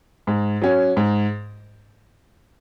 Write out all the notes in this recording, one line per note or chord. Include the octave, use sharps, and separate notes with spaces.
G#2
F#3 C#4
G#2